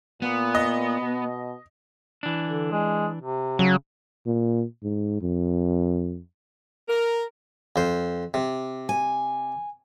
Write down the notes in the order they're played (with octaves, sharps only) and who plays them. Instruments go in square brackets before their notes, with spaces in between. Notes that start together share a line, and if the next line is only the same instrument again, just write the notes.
[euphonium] A#2 [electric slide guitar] B3
[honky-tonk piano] D#5
[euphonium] B2
[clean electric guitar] E3 D4
[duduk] D3
G#3
C3
[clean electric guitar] C#3 [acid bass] F#3
[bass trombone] A#2
G#2
F2
[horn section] A#4
[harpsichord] F2 C5
C3
[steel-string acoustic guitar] G#5